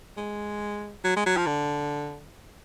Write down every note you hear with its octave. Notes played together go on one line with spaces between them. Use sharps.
G#3
F#3
G#3
F#3
F3
D3